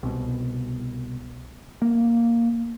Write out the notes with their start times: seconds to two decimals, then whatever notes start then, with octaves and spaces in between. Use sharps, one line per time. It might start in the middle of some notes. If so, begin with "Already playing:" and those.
0.03 C2 B2
1.82 A#3